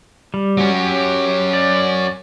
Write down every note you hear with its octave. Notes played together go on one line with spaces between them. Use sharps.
G3
F#3 C#4
G4
D5